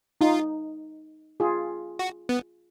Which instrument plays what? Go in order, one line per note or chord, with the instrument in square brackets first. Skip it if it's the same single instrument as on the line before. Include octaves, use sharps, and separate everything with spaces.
[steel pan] D#4 [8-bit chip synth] F4
[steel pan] F4 G#4
[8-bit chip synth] F#4
B3